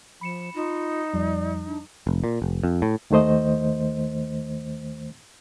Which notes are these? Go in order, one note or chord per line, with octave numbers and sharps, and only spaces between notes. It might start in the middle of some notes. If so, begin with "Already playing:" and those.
F3 B5 C#7 E7
D#4 F4
F2 F3 G3 D5
D4
F1
A#2
F1
F2
A2
D#2 D#3 A3 C5 D#5